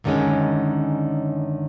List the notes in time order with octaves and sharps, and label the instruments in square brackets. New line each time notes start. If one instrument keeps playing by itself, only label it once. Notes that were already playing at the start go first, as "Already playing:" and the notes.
[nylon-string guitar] F#2 D3 D#3 G3 G#3 C#4